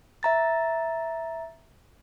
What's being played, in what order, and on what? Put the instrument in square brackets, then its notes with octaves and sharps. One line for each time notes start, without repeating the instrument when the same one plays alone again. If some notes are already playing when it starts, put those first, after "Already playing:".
[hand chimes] E5 A#5 A6